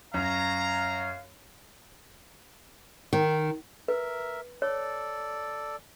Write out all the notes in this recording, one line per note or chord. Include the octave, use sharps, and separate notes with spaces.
F#2 C#4 F5 A#5
D#3
A#4 B4 E5
A4 C#5 D5